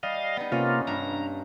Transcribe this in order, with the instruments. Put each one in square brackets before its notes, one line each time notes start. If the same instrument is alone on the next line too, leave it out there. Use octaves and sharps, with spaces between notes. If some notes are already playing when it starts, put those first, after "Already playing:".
[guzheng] G3 [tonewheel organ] D#5 F5
[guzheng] B3 D#4
[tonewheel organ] C3 A#3 F4 [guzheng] C#4
[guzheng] G2 [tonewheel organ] A#5